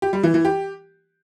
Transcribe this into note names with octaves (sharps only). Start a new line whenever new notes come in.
G4
G3
E3
E3
G4